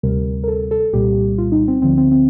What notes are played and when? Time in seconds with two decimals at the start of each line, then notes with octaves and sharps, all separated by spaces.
0.03 D2 C3 G3 A#4
0.44 A#4
0.48 A4
0.71 A4
0.93 C2 A#2 G3 G4
1.38 F4
1.52 D#4
1.68 C4
1.82 D2 D3 F3 C4
1.97 C4
2.11 C4